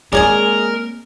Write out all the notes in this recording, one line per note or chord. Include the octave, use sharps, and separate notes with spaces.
G#3 A#3 C4 G#4 A#4 C#5 D5